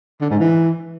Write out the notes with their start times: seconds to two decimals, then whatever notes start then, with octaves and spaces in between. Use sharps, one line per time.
0.21 D3
0.30 G#2
0.39 E3